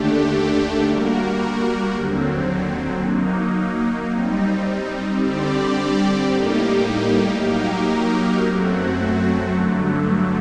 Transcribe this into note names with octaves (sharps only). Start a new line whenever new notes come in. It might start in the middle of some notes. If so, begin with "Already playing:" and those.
Already playing: D#2 D3 A3 D4 G4
G3 A#3 F#4 A#4
D#2 D3 F#3 C4
F#3 A#3 D#4
G3 C4 D#4
D3 G3 C4 G4 D5
A2 G3 A#3 D#4 G4
F#3 A#3 D#4 G4 A#4
F#2 F#3 A3 C4 F#4
G2 D3 F#3 A3